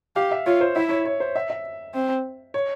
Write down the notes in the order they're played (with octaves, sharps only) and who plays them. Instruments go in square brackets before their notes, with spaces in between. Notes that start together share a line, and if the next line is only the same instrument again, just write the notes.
[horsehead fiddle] G4 [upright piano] F5
[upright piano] E5
[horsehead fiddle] F4 [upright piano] C#5
[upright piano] C5
[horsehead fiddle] E4 [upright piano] E5
[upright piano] C#5
C#5
C5
E5
E5
[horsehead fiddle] C4
[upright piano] C#5